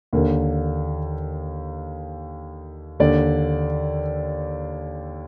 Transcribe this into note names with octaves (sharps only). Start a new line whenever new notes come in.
D#2 D3 A#4
D#2 D3 D5